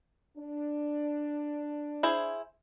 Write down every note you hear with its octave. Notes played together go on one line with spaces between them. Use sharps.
D4
E4 G#4 C5